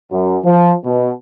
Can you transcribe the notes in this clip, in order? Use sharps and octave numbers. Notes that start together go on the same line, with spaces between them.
F#2
F3
B2